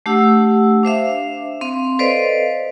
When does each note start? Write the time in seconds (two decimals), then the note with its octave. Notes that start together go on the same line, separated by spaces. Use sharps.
0.06 A3 D4 G4 F#5 E6
0.83 D4 C5 E5 F5
1.61 C4 F5 C6
1.99 A4 B4 C5 D5 D#5 F5